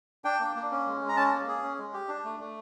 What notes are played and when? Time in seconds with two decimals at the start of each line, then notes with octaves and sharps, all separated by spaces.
0.25 D4 G5
0.40 A#3
0.55 A#3
0.71 C#4
0.86 G#3
1.01 G#3
1.09 A#5
1.16 C#4 A5
1.32 A#3
1.47 G#4
1.63 C#4
1.78 G#3
1.93 G4
2.09 D4
2.24 A3
2.40 A3